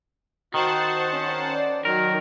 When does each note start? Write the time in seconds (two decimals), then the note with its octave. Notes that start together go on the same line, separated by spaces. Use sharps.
0.54 D#3 F#4 C5 F#5 A5
1.11 C#4
1.53 D5
1.85 D#3 F#3 A#4